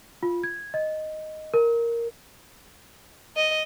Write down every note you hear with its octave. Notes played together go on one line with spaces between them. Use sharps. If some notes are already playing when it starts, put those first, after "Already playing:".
F4
G#6
D#5
A#4
D#5